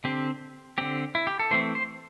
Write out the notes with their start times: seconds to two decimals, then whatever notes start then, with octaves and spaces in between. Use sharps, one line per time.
0.04 D3 C4 G4
0.78 D3 C4 G4
1.15 E4
1.27 G4
1.39 A4
1.51 E3 A3 C4 C5
1.75 C5